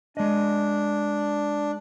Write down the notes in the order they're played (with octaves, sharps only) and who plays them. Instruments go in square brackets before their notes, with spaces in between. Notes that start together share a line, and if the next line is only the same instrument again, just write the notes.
[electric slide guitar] G#3 D#5 [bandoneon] D4